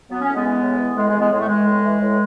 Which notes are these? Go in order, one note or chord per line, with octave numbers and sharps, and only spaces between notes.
F#3 B3
C#4
A2
G#3 B3
E3
A2
E3
A2 G#3
G#3
E3
G#3 B3
A2 G#3
A3
E3 G#3
A2
E3
A2